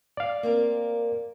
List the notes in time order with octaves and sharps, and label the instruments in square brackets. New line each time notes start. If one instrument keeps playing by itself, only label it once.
[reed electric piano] D5 F5
[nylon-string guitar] A#3 C4 A#4